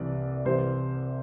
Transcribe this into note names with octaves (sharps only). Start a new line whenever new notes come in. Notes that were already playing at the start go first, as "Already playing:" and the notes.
Already playing: C2 C3 E3 D5
C2 C3 E3 C5